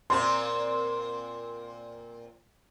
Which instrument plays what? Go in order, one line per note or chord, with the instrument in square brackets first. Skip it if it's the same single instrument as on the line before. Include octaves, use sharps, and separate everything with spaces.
[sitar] A#2 C4 [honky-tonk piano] C6